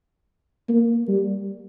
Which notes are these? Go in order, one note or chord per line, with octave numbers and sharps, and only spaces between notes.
A#3
G3